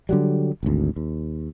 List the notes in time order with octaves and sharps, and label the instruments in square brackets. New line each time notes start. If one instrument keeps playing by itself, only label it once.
[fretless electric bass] D3 F#3 G3
G#1 D2
D#2